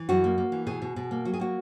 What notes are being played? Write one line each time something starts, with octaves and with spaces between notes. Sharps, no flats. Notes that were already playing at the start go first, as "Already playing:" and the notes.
Already playing: E3
F#2 F#4
A#3
A#3
E3
B2 G#4
B2
B2
A#3
F#3 F#4
G#4
A#3 F#4